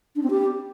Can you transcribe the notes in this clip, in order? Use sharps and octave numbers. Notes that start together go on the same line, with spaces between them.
D4
C4
G4